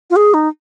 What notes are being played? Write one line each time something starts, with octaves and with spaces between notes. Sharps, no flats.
F4
G#4
D#4